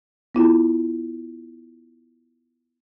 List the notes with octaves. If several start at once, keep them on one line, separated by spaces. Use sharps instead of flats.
B3 E4 F4